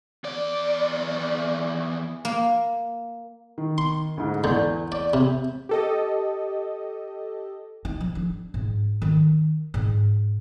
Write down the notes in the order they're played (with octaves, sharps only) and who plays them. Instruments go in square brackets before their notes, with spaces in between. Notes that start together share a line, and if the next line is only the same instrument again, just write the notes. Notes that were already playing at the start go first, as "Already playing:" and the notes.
[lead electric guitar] E2 D5
[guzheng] A#3
[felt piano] D#3
[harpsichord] C6
[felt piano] D2 G#2
[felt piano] E2 G6 [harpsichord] D3
[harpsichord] D5
C3
[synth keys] G4 A4 D#5
[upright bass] D#4
F3
D4
G#2
D#3
G#2